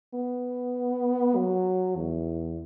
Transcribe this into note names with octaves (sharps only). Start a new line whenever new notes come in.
B3
F#3
E2